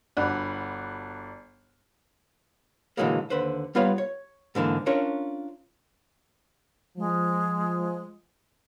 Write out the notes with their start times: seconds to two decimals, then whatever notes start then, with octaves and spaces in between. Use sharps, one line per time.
0.17 G1 D4 F#4 B5 F#6
2.97 A#2 D3 E3 F#3 G#3 A#3
3.30 D#2 D3 B4 C5
3.75 G3 B3 F4 B4 C#5 F5
3.98 C#5
4.55 G#2 D3 E3 A#3
4.86 C#4 D4 F4 A#4 C#5
6.97 F3 G#3